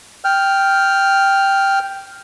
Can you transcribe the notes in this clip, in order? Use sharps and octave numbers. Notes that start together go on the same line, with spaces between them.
G5 F6